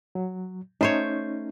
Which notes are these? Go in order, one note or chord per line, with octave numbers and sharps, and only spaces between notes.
F#3
A3 C#4 D#4 C5 C#5